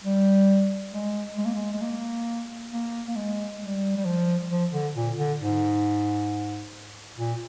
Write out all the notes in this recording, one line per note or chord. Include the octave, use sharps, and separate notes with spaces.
G3
G#3
G#3
A#3
G#3
G#3
A#3
A#3
A#3
G#3
G3
G3
F3
F3
D3
A#2
D3
G#2
A#2